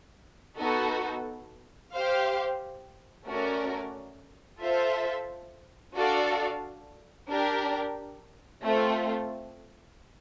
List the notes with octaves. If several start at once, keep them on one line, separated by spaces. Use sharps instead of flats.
B3 D#4 F#4 A4
G4 C5 F5
A3 C#4 F#4 A#4 D5
F4 A4 C5 E5
D4 F#4 A4 D5 F5
D4 G4 A#4
A3 C4 F4